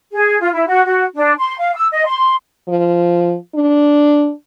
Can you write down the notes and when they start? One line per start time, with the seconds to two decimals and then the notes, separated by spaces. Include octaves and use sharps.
0.12 G#4
0.40 F4
0.53 E4
0.66 F#4
0.84 F#4
1.14 D4
1.38 C6
1.58 F5
1.74 E6
1.91 D#5
2.06 C6
2.68 F3
3.55 D4